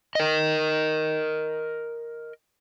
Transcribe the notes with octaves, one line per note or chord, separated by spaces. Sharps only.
A#4 D#5